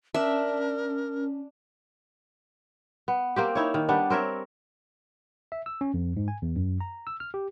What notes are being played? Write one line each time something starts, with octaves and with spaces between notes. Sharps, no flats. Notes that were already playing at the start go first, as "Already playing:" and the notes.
C#4 D4 A#4 E5
B3
A#3 C4 G4
D#4 E4 C#5
D#3
G3 B3 D4
C4 A#4 C#5 E5
E5
E6
C#4
F2
G#2
G#5
E2
F#2
A#5
E6
F6
G4